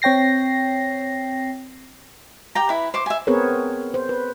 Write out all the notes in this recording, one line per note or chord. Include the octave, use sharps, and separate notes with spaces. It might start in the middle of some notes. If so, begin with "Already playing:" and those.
C4 C#5 G5 A#6 C7
G4 G5 A#5
E4 B4
C5 D6
E5 G#5
B3 C4 G#4 A#4 B4 C#5
C5
B4